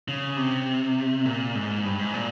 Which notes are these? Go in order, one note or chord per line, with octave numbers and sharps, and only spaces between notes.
C#3
C3
A#2
G#2
G2
G#2
A#2